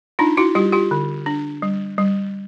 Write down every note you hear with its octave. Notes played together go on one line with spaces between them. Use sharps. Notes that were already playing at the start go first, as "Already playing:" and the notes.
D4 D#4 F4
E4 F#4
G3 F4 G4
F4 G4
D3
D4
G3
G3